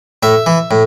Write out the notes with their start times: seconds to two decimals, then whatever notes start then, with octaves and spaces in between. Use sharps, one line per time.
0.23 A2 E5
0.46 E3
0.71 A2